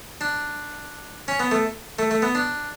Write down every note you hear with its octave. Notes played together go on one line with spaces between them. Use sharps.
D4
C#4
B3
A3
A3
A3
B3
D4